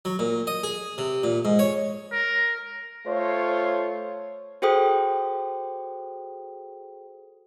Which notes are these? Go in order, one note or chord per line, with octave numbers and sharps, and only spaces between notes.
F#3
A#2
D#5
G#4
C3
A#2
G#2
C#5
A#4
A3 F4 C5 C#5
F#4 G#4 A4 C5 G5 D#6